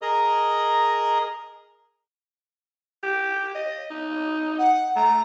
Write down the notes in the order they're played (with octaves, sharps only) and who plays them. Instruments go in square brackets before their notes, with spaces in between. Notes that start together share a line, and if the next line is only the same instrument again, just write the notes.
[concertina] G#4 A#4 D#5 A#5 D#6
[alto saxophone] G4
D#5
D#4
[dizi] F#5
[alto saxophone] A3 [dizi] A#5